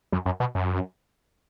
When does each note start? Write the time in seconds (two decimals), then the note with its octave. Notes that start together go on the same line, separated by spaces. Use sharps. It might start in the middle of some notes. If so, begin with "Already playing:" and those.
0.12 F#2
0.26 F#2
0.40 B2
0.55 F#2